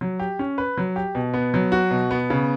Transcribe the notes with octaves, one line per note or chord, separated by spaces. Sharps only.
F#3
G4
C#4
B4
F#3
G4
B2
B3
F#3
F#4
B2
B3
C#3